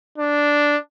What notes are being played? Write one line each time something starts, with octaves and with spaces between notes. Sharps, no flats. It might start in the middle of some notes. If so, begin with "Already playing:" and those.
D4